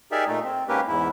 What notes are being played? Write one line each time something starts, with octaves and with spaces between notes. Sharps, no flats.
D#4 G4 G#4 A#4 D5 E5
A#2 A3 D#4
C4
G#2 A#3 C#4 G4 A#4 B4
E2 G#2 E4